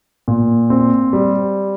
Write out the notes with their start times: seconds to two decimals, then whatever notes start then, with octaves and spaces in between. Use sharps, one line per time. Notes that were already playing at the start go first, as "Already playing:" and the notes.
0.28 A#2
0.70 C4
1.13 G3